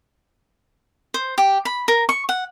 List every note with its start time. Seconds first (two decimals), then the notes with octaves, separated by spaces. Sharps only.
1.14 C5
1.38 G4
1.65 B5
1.88 A#4
2.09 C#6
2.29 F#5